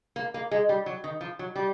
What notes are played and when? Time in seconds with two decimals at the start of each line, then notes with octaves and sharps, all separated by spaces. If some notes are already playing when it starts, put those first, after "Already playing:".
0.16 A#3
0.34 A#3
0.51 G#3
0.69 G3
0.86 F#3
1.04 D#3
1.21 F3
1.39 F#3
1.56 G3